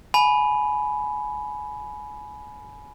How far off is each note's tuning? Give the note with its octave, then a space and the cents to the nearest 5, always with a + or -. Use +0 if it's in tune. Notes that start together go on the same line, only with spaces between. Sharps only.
G#5 +20 B5 +0